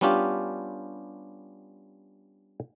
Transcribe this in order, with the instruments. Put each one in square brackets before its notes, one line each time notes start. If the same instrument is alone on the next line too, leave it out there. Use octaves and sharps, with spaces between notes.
[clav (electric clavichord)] G3 B3 C#4 D4 F4 G4